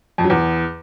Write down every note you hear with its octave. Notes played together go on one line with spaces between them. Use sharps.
F2
F#3
E2